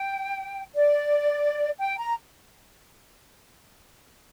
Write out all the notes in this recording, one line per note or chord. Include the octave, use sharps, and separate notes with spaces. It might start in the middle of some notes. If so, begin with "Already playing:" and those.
Already playing: G5
D5
G5
A#5